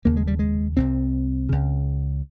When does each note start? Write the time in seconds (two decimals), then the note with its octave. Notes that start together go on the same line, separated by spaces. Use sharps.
0.05 F1 D#2 C#3 A#3
0.17 G#3
0.27 G3
0.39 G#3
0.77 C2 C3 C4
1.49 C#2 C#3